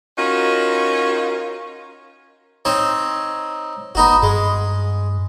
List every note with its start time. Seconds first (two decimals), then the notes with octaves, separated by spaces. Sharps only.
0.18 C#4 D#4 F4 F#4 A#4
2.65 C4 D#4 C#5
3.95 F#1 B3 D#4 F#4
4.23 G2 G#3